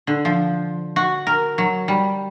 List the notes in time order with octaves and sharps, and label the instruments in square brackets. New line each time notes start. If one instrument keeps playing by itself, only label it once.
[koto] D3
F3
F#4
A#4
F#3
G3